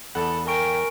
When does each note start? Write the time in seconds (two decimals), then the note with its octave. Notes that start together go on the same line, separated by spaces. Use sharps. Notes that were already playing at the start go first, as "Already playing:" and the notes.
0.15 E2 A4 F#5 B5
0.47 A#4 G5 G#5 C#6 D7